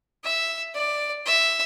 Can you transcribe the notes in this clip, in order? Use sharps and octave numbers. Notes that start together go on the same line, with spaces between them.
E5
D5
E5